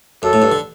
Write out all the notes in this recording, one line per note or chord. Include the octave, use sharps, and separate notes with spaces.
F#2 A4
A2
G2
D3